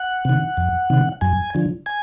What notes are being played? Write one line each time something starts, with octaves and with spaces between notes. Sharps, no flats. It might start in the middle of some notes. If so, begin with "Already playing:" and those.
Already playing: F#5
C3 D#3
F2
C3 D#3
F#2 G#5
D3 F3
G#5